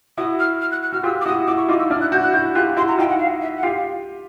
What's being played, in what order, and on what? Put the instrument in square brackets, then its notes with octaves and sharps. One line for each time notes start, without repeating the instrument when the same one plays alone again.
[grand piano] E4 F#4 [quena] D#6
[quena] F6
F6
F#6
F#6
[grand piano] F#4 [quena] F6
[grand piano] F4 G4 [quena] E6
[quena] D6
[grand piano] E4 F#4 [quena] D#6
[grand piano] E4 F#4 [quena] D6
[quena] C#6
[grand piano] D#4 F4 [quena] D6
[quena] E6
[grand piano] D4 E4 [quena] F6
[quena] F#6
[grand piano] E4 F#4 [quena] G6
[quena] F#6
[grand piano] E4 F#4 [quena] G6
[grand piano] F4 G4 [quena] F#6
[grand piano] E4 F#4 [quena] C6
[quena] A#5
[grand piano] D#4 F4 [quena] G5
[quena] F#5
F5
E5
F#5
[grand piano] F4 G4 [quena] F5